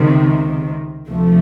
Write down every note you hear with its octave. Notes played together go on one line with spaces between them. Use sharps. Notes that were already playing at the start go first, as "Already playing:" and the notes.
Already playing: C#2 C3 D#3
D2 C3 F3 A3